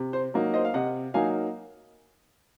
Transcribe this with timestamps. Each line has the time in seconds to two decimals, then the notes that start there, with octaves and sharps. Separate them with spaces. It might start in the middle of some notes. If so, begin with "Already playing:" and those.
Already playing: C3
0.13 C5
0.34 F#3 A#3 D#4
0.54 C5 D#5
0.65 F5
0.74 C3 D#5 F#5
1.14 F#3 A#3 D#4 F5 G#5